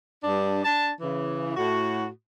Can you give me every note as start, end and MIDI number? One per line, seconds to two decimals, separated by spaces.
0.24 0.63 43
0.24 0.63 62
0.64 0.90 62
0.64 0.90 81
1.00 1.56 49
1.00 1.56 52
1.56 2.07 45
1.56 2.07 66